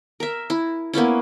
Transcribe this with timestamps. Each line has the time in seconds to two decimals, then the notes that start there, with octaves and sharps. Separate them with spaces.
0.20 A#4 E5
0.50 E4
0.93 A#3 B3 C#4 E4